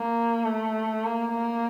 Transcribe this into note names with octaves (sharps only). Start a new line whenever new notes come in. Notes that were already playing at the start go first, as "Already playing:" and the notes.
Already playing: A#3
A3
A#3
A#3